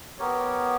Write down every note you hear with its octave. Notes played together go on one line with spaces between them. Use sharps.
B3 G4 A#4 C#5